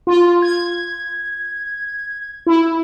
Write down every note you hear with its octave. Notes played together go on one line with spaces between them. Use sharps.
F4
G#6
E4